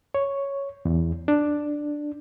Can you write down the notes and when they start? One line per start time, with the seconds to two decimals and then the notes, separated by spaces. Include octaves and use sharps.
0.14 C#5
0.85 E2
1.28 D4